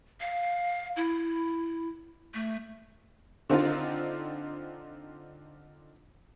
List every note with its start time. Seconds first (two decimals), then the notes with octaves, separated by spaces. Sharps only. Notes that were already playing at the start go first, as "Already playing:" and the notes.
0.20 F5
0.96 E4
2.34 A3
3.49 D3 C4 D#4 F4